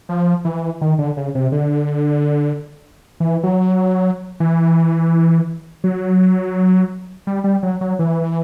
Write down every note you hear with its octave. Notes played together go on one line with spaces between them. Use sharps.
F3
E3
D#3
D3
C#3
C3
D3
E3
F#3
E3
F#3
G3
G3
F#3
F#3
E3